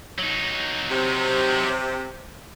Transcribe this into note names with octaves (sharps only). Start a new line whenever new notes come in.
F#3 D#4
C3